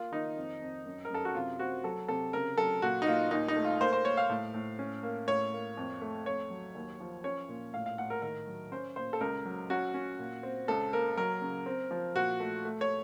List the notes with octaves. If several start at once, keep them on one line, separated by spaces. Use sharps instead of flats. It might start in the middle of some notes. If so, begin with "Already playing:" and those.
Already playing: A#3 F4
D#3 D#4
F2
F2
F#2
A#4
F#2 A4
F#4
C3 F4
C4 F#4
F#3 A4
C3 A4
C#3 A#4
F#3 A4
A#2 F#4
D#4
A#2 F4
D#2 D#4
D#4
A3
F4
A#3 C5
C5
A#3 C#5
F5
A2
A2
C#4
A#3
A2 C#5
A#3
F2
A3
F2 C#5
F#3
D#2
F3
C#4 C#5
A#2
A2 F5
F5
A2 F#5
A#4
D#3 A#4
F#3
C#4 C5
A#2 C5
A4
C#2 A#4
F#3
C#4 F#4
C#4
A#2
C4
C#2 A4
A#3 A#4
F#3 A#4
C#3
C4
F3
A#2 F#4
A3
A3
C#5